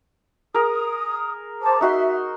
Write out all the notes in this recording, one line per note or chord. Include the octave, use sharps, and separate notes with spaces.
G#4 A#4 D#6
C5 A5 D6
D#4 F#4 E5 C6